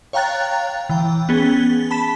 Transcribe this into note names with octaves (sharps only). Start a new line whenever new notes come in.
C#5 F5 G5 A#5 F#6 A6
E3 G5
B3 C#4 G#4 A6 G7
A5 B5 B6 E7